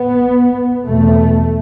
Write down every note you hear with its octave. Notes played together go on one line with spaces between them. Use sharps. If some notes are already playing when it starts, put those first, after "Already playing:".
Already playing: B3
E2 B2 A3